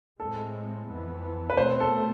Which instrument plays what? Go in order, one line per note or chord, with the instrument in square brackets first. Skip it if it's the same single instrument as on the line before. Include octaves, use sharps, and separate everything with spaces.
[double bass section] A2 G#3 C4 [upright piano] A4
[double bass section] F2 E3 B3
[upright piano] B4
[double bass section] B2 A3 C4 [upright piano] C5
[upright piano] A4